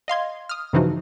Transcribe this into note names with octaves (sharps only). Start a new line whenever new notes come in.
D#5 F5 C6 G#6
D#6 F6
G2 C#3 E3 F3 D#4 F#4